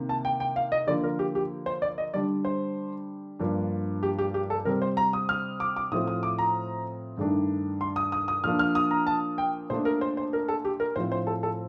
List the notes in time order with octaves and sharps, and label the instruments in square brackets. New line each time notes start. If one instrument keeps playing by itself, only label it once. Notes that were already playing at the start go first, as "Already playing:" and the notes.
Already playing: [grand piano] C3 D#3 A#3
A5
G5
G5
F5
D#5
D3 F3 A#3 D5
A#4
G4
G4
C5
D5
D#5
D3 G3 D4 D5
C5
G2 F3 A#3 D4
G4
G4
G4
A4
C3 G3 C4 A#4
C5
A#5
D#6
F6
D6
D6
A2 F3 A3 C4 D#6
D#6
D6
A#5
G2 D#3 A3 D4
C6
D#6
D#6
D#6
A#2 F3 A#3 D4 F6
F6
D#6
A#5
A5
G5
A#2 A3 D4 C5
A#4
C5
C5
A#4
A4
G4
A#4
A2 F3 C4 C5
C5
A4
A4